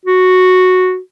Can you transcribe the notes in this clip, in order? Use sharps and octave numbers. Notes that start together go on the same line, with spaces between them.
F#4